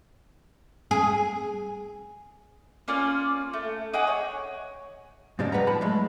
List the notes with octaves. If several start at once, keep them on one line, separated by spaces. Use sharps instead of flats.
G#4
A#3 C#4 F4 D5
A3
D#4 G#4 F#5 D6
C#5
G#2 C#3 G3 G#3 D4
G3 B4 F#5 A#5
A2 F3 A5 B5
F#3 G#3 A3 D#4